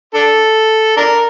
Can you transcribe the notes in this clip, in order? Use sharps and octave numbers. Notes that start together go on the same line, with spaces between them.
D4 A4
D4 A#4